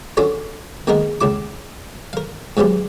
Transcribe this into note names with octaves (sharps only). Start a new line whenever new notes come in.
C#4 D4 F4 F#4 A4 C#5
D#3 G#3 A#3 B3 D#4 A#4
C#2 C#3 E4 D6
A#4 F5
G#2 E3 F#3 B3 G4